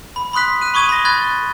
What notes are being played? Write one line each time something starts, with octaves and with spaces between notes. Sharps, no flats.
B5
B5 C6 D#6 F#6 B6
F#6 D#7
B5 C#6 D#6 G#6 D#7 G7
B5 A#6
B5 F#6 G#6 A6 G7